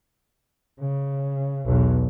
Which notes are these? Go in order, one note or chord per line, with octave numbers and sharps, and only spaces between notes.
C#3
B1 E2